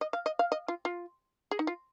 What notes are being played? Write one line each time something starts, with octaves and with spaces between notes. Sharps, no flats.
D#5
F5
D#5
F5
D#5
F4
F4
G#4
D#4
F4